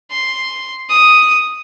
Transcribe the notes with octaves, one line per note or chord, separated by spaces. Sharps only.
C6
D#6